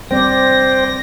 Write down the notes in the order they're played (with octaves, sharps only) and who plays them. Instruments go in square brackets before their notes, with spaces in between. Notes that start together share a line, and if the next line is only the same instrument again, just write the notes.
[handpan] G3 C4 D5 [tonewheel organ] C5 G5 [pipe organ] A#6